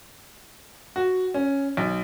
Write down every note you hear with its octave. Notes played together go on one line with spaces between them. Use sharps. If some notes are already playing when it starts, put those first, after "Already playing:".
F#4
C#4
B1